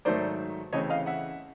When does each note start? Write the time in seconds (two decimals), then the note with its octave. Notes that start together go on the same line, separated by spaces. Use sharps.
0.05 G#2 D#3 F#3 A3 C5 D5
0.73 C#3 E3 A3 C4 C#5 D#5
0.90 D#5 F5
1.06 E5 F#5